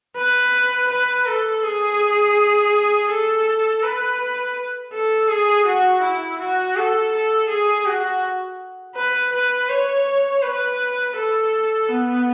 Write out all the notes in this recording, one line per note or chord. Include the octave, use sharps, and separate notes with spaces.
B4
B4
A4
G#4
A4
B4
A4
G#4
F#4
E4
F#4
A4
A4
G#4
F#4
B4
B4
C#5
B4
A4
B3